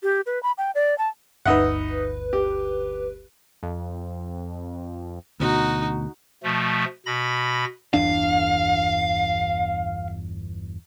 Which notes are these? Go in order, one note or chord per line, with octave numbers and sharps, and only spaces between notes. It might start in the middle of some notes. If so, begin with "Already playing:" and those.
G4
B4
B5
G5
D5
A5
G1 D2 D#4 B4 E5 F#5
G4
F2
D2 B2 D#4 F#4
B2 F3 A3
B2 B5 A#6
G1 E2 D4 F5